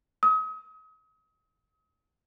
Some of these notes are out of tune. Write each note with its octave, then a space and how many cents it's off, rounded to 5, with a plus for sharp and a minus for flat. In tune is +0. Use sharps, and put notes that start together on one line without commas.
D#6 +40